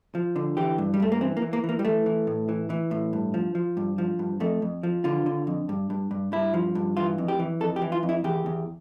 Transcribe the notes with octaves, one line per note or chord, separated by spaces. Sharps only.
F3
D3
E3 G4
G2
G3
G2 A3
A#3
E3 C4
A#3
E3
A#3
E3
A#3
G3
E3 A3
E3
A2
E3
E3
A2
G2
F3
F3
G2
F3
G2
F2 A3
F2
F3
D3 F4
D3
F2
G2
G2
G2
G2 E4
F3
G2
E3 F4
F2
G4
E3
F2 A4
G4
E3
F4
F2
E4
E2 G4
E2